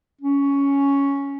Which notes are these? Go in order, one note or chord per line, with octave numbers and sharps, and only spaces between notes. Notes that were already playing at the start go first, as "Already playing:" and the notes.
C#4